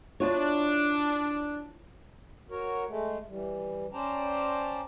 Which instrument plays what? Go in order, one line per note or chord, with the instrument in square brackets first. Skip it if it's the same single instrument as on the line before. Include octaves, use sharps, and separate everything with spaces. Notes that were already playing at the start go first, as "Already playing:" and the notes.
[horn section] D4 [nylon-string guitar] E4 F4 C#5
[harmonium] F#4 A#4 C#5
G#3 A3
E3 G3
C#4 C5 D5 G5 A5 A#5